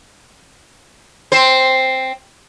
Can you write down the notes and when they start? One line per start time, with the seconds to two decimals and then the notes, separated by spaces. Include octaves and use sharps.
1.32 C4 C5